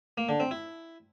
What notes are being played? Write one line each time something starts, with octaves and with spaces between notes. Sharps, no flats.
A#3
D3
C4
E4